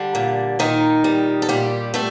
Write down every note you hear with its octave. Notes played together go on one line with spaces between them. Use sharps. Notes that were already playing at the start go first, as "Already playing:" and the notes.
Already playing: D3 G3 D4
A#2
A#2 D#3 D#4
G3
A4
A#2 G3 G4
G3 A3 A4